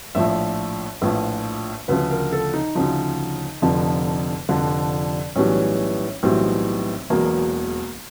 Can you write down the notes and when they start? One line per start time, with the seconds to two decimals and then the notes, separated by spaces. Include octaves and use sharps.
0.15 A#1 A2 F3 E5
1.01 A#1 A2 F3 B4
1.88 D2 C#3 F3 B4
2.11 A#4
2.33 A4
2.54 D#4
2.75 D2 C#3 F3
3.62 F1 F2 D3 F3
4.49 F1 F2 D3 F3 D4
5.36 B1 A2 E3 G3 C#4
6.23 B1 A2 E3 G3 C4
7.10 E1 E2 B2 F#3 A#3